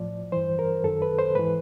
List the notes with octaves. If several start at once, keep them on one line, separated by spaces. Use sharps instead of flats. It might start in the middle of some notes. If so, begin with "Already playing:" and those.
Already playing: A2 F3 D5
G2 E3 C5
A#4
F#2 D#3 A4
B4
C5
G#2 E3 B4